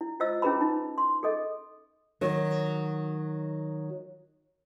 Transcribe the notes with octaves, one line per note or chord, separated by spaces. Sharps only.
E4
F4 C5 D#5 E6
C#4 E4 G#4 B4 A#5 B5
D#4
C6
G#4 A4 D#5
D#3 F#3